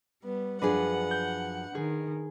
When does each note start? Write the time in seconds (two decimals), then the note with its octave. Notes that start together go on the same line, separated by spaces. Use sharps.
0.24 G3 B3
0.62 F#2 F3 D4 G#4 B4 F#5
1.11 G6
1.75 D#3 G#4